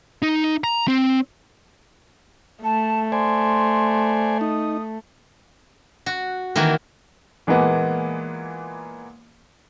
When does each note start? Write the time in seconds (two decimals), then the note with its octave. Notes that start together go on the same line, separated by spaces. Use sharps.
0.22 D#4
0.64 A#5
0.88 C4
2.64 A3 A5
3.12 C5 D5 G#5 C6
4.41 D#4 D#6
6.06 F#4
6.56 D#3 E3 A#3 F#4
7.47 A#2 E3 G#3 A#3 B3